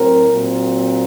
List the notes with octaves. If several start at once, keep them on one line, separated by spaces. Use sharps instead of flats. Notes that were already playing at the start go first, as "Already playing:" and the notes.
Already playing: A2 F#3 C4 A#4
A#2 F#3 C4